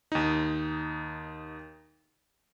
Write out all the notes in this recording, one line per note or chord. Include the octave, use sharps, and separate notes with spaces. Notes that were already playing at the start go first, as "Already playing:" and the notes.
D#2 D#4